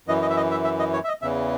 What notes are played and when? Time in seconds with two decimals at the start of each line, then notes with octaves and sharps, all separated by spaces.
0.08 F#2 E3 D#5
0.22 D#5
0.30 E5
0.37 D#5
0.51 E5
0.64 E5
0.79 D#5
0.93 C#5
1.04 E5
1.08 D#5
1.22 E2 C#3 E3 E5